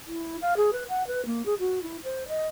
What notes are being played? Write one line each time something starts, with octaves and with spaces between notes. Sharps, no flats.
E4
F5
G#4
B4
F#5
B4
A#3
G#4
F#4
E4
C5
D#5